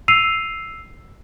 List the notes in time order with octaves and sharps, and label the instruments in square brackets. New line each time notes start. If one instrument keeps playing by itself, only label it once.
[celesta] E6 C7 D#7 F7